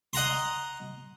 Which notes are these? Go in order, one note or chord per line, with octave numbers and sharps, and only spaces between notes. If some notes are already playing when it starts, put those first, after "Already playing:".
D#5 F#5 A#5 C6